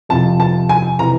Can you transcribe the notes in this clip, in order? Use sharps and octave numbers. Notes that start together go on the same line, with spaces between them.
F2 C3 F3 A5
A5
G#5
C3 E3 A#5